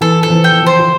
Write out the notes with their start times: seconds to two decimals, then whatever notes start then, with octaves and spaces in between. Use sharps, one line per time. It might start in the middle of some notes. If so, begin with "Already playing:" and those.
0.01 E3 A4
0.23 F3 A4
0.30 E3
0.44 G5
0.59 F3
0.67 C5
0.79 F4